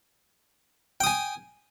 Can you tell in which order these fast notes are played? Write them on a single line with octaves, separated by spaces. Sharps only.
G5 D#6 G#5